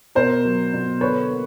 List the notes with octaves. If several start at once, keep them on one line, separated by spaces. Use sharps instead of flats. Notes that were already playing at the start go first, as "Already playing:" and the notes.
B2 A#4 C5
F#3
B2
D3 B4 C#5
A#3